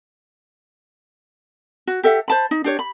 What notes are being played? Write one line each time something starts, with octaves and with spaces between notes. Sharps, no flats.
F#4
G4 A4 E5 F#5
C5 A5 B5
D#4
D4 G4 C#5
B5